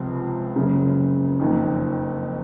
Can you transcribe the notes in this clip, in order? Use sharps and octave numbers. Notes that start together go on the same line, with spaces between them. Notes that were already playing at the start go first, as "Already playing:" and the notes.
Already playing: C#2 C3 F3 C4
F#1 F#2 C#3
F#1 F2 D#3